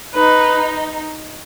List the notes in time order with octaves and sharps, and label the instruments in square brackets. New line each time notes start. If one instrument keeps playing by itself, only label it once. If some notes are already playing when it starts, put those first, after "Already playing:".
[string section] D#4 [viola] B4